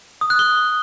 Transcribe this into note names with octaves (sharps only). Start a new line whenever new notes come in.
D#6
F#6
G7